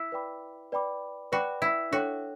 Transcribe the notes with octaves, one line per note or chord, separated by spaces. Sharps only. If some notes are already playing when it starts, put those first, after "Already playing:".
Already playing: E4
B4 D5 G5 B5 D6
B4 D5 G5 B5 D6
F#4 B4 D5 G5 B5 D6
E4
D4 F#4 A4 C#5 G5